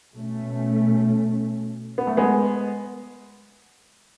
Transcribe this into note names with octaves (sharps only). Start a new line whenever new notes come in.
B2 A3 C#4
B3
A3
G#3 B3